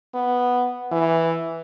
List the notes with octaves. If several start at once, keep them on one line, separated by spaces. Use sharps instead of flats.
B3
E3